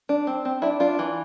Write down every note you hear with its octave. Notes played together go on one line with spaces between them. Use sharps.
D4
C4
C4
D4 E4
D4 F4
E3